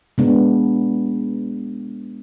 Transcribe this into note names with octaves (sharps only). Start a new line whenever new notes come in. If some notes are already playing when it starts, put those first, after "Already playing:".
G#3 B3 D4